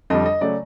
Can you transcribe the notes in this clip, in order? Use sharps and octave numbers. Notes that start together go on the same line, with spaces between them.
F2 D3 G3 D#5
D#5
C#3 F#3 A3 D5